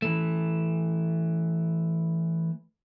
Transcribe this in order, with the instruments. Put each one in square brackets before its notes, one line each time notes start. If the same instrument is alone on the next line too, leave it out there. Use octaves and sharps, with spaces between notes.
[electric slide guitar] E3 A3